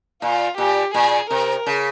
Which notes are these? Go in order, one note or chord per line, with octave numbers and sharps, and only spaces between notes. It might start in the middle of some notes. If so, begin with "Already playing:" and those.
A#2 F4
A#2 G4
A#2 G#4
C3 A#4
C#3